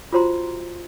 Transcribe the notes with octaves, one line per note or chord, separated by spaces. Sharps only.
F4 F#4 C5 A#5 C6